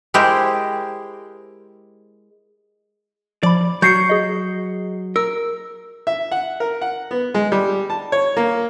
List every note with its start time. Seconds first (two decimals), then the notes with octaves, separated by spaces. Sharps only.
0.14 G#3 E4 G4 A#4 C5
3.43 F3 D5 B5
3.82 F#3 G6 C7 C#7
4.09 G#4 D#5
5.16 A#4 E6
6.07 E5
6.32 F#5
6.60 A#4
6.81 F#5
7.11 B3
7.34 G#3
7.52 G3
7.90 A5
8.12 C#5
8.37 A#3